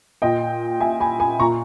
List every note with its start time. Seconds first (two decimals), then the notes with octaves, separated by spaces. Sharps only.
0.22 A#2 D#5 G5
0.80 E5 G#5
1.00 G#5 B5
1.19 G#5 B5
1.39 A#2 A#5 C#6